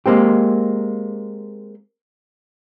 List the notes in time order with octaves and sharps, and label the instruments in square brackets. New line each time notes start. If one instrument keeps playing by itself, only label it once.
[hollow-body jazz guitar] G#3 A#3 C4 G4